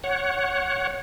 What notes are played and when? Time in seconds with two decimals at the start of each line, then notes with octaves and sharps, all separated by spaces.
0.04 C#5 F#5